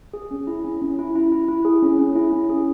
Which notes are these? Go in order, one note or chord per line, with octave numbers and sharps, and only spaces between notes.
G#4
C#4
E4
C#4
C#4
E4
E4
E4
E4
G#4
C#4
C#4
E4
C#4
G#4